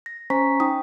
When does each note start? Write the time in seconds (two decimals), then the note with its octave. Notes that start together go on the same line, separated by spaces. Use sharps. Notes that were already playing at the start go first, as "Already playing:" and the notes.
0.06 A#6
0.30 C#4 C5 G#5 A#5 C#6 B6
0.60 D#4 G5 D#6